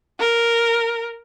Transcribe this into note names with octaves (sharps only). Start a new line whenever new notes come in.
A#4